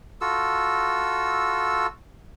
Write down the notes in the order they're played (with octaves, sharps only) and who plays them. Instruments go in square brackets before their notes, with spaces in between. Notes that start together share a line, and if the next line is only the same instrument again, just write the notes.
[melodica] F4 F#4 A4 E6